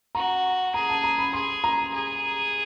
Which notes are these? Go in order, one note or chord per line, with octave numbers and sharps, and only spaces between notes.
F#4 A#5
G#4 A#5
A5
A#5
B5
G#4 C6
A#5
G#4